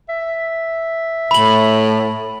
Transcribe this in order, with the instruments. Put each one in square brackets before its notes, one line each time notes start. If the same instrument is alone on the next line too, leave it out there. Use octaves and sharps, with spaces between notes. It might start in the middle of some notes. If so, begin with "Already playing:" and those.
[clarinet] E5
[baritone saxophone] A2 [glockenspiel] B5 F#7